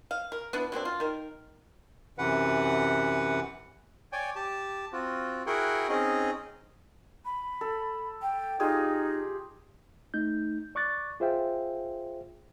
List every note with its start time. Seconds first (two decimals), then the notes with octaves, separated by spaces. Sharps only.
0.11 F5
0.32 A#4
0.53 B3 D4 E4
0.72 F#3 A#3 C4 D4
0.85 F4
1.00 D#3 A#4
2.18 F#2 C3 E3 B4 F#5
4.12 C#5 D5 G5 G#5
4.36 G4 A5
4.93 C4 F4 F#4
5.46 E4 F#4 G#4 A#4 F#5 G5
5.89 C4 C#4 D#4 G#4 D#5
7.25 B5
7.61 A4
8.22 G5
8.60 D#4 F4 G4 G#4
10.14 A3 D#4 G6
10.75 D5 C#6 D6 F#6 A6
11.20 F4 G#4 C5 E5 F5 G5